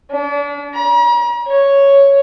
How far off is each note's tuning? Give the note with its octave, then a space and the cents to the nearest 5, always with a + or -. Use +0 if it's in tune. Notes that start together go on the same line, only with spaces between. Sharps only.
D4 -35
A#5 +45
C#5 +0